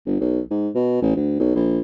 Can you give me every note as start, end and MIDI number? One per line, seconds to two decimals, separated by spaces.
0.06 0.16 31
0.20 0.40 35
0.50 0.69 44
0.75 0.99 47
1.02 1.13 33
1.16 1.38 38
1.39 1.51 35
1.55 1.79 34